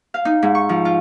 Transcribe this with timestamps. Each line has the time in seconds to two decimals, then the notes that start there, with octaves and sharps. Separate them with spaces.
0.14 F5
0.25 D#4
0.42 G#2
0.55 C#6
0.69 F3
0.85 F4